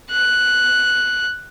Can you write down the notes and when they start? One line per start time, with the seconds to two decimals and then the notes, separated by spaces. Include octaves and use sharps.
0.11 F#6